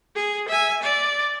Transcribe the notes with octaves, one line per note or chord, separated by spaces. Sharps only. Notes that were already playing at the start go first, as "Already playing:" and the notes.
G#4
E5 G#5
D5